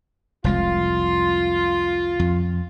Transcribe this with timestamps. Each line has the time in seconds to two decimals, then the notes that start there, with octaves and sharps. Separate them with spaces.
0.44 F1 C2 G#3 F4
2.19 F2